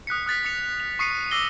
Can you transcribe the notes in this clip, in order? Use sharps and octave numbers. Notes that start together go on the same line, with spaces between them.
D#6 F#6 B6 C#7
D#6 F#6 A6 B6
D#6 C#7 F7
F7
C#6 D#6 C7 C#7 D#7
D6 E6 A#6 C7 G7